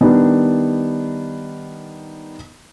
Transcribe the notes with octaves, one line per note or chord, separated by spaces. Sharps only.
D#3 G3 B3 D4